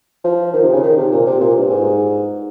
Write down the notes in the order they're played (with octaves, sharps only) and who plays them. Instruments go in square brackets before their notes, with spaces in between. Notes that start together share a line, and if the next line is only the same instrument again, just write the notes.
[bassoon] F3
D#3
C3
C#3
D#3
C3
A#2
C3
A#2
G2
G#2